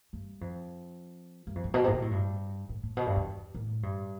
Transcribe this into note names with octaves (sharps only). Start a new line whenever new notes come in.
G2
F2
G2
F2
G2
B2
C3
A2
B2
A2
G2
A2
A2
B2
G2
E2
A2
G2